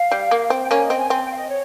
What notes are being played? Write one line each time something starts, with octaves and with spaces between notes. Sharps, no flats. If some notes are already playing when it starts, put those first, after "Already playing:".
Already playing: F5
G3
A#3
C4
G5
A#3 C#4 G#5
D#5
C4
G#5
C4 G#5
G5
F5
D#5
C#5